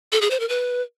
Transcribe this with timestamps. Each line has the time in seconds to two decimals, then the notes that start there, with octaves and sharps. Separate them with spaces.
0.12 A4
0.21 G#4
0.31 C5
0.40 A#4
0.49 B4